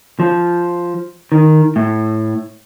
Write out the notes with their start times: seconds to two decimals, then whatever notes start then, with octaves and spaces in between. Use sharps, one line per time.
0.20 F3
1.32 D#3
1.76 A2